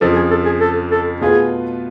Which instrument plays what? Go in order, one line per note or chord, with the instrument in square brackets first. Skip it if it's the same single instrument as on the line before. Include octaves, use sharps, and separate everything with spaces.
[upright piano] F2 C#3 F3 [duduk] A4
[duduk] G#4
A4
G#4
A4
A4
[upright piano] B2 A3 F4 B4 [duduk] G#4